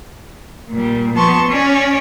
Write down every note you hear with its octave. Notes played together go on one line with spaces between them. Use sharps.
A#2 G3
F3 B3 A5 C6 C#6
C#4 C#5 D5